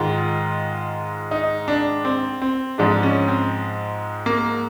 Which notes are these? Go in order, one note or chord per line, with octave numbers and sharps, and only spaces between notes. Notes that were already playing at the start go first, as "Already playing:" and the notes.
Already playing: G#2 D#3 G#3 F4
D#4
D4
C4
C4
G#2 F3 G#3 D4
C#4
C4
A#3